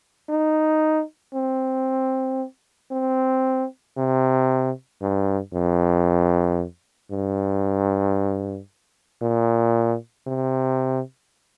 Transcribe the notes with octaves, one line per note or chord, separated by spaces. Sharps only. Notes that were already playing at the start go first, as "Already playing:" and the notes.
D#4
C4
C4
C3
G2
F2
G2
A#2
C3